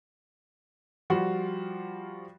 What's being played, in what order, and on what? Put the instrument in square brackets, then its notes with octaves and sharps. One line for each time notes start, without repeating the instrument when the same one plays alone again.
[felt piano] F3 G3 F4 F#4